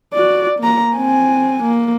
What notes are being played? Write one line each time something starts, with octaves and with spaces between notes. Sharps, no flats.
F#4 D5
A#3 A#5
C4 G#5
A#3